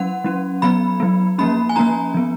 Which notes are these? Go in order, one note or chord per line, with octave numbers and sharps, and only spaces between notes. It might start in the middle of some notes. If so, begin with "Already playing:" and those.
Already playing: F#3 C#4 F#5
F#3 C#4
F#3 B3 B5
F#3 B3
F3 A#3 C#4 B5
G#5
F3 A#3 C#4 A#5
F3 B3